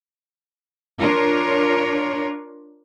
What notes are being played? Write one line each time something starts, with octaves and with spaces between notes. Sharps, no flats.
D4 F4 A#4 C#5